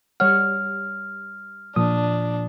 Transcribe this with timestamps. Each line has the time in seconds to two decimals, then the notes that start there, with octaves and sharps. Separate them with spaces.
0.20 G3 C#5 F#5 F6
1.76 A#2 F3 D4 D#6